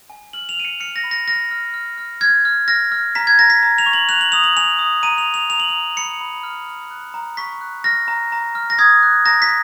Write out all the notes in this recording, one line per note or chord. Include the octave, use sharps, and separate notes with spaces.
G#5
F6 F#7
F7
F6 D#7
C#7
F6 C#7
A#6
B5
A#6
F6 A#6
F6
F6
F6
F6 G#6
F6
F6 A#6
F6
A#5 B6
G#6
A#5 A#6
B6
A#5
F7
C#6
F#7
F#6 F7
F#7
D#6 F7
F#7
G#5 F7
D#6
A#5 D#7
F7
A#5
F7
A#5 F7
F#7
F7
A#5
B5 C#7
B5
F6
F6
F#6
A#5
C#6 B6
F#6
F6 A#6
A#5
A#5
F6
A#6
D#6 G#6
F#6
A#5 A#6
B6